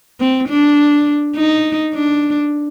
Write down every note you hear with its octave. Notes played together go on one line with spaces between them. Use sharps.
C4
D4
D#4
D4